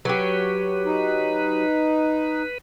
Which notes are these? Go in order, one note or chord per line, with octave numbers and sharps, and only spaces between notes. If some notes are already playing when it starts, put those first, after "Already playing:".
F#3 G4 B4
D#4